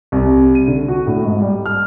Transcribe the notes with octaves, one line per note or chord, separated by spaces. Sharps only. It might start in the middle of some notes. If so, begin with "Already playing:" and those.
C2
D#7
D3
F#4
A2
G#2
G3
F6